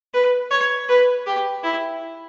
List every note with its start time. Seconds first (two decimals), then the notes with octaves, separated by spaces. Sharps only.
0.14 B4
0.51 C#5
0.89 B4
1.26 G4
1.63 E4